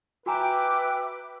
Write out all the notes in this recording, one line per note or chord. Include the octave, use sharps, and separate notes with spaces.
F#4 B4 E5 G5 G#5 A#5 D6 E6